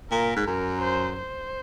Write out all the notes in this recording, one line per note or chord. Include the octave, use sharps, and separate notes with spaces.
A#2 A#4
G#2
F#2 A#4
C5
C5